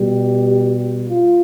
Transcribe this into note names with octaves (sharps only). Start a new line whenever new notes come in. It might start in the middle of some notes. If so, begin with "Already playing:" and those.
Already playing: B2 G3 G4
F4